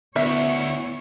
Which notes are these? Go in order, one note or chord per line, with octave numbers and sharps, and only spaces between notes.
D2 B3 E4 C#5 E5